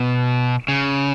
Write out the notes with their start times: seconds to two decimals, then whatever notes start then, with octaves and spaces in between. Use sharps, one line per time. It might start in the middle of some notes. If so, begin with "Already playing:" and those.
Already playing: B2
0.68 C#3